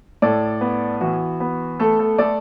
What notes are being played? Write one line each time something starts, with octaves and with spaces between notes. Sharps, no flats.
A2 A4 D5
B3
E3 F#4
B3
A3 A4
A4
A3 A4 D5